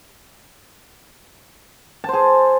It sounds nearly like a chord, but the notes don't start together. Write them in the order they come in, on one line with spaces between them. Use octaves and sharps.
A5 C5 G#4